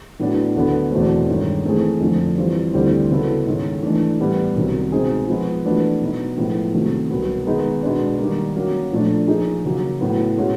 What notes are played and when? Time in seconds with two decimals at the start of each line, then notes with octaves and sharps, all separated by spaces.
0.20 A2 F#3 B3 D4 F#4
0.56 D2 D3 F#3 B3
0.91 E2 B2 F#3 A3 C4
1.29 G2 D#3 G#3 C#4
1.65 E3 A3 C4 E4 G#4
2.00 F2 D3 F3 A3
2.38 E3 G3 C4 F4
2.73 D2 D3 G3 C4 E4
3.10 C#3 F#3 B3 E4 A4
3.46 G#2 D#3 G#3 C#4
3.83 E3 A3 D4
4.20 A2 E3 G3 B3
4.55 C2 C3 D#3 F#3
4.92 B2 G#3 C4 D#4 G#4
5.28 F3 G#3 B3
5.65 E3 A3 D4 F#4 B4
6.01 B2 F#3 B3 D#4
6.38 A2 F3 G#3 B3
6.74 C3 D#3 F#3 A3
7.10 C2 B2 F#3 B3
7.47 D#3 G#3 B3 D#4 G#4
7.83 B2 G#3 B3 D4
8.19 D#3 G3 A#3
8.56 F#3 A#3 C#4 F#4
8.92 A#2 F3 A3 D4
9.28 F3 A#3 D#4 G#4
9.65 C#3 F#3 A#3
10.00 A2 F#3 B3
10.38 B2 G#3 C#4 F#4